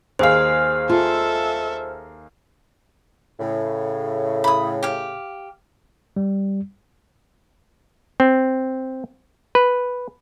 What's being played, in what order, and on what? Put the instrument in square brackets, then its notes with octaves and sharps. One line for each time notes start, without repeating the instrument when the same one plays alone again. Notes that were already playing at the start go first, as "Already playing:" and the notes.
[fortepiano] D#2 G#4 F5 [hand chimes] C5 F6
[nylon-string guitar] F4 [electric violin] A4 E5
[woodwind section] A2 C#3
[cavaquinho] B5 D#6
G4 F5
[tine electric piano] G3
[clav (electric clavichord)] C4
B4